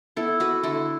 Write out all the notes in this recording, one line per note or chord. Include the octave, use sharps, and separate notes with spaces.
B3 E4 A4
F#4 B4
D3 E4 A4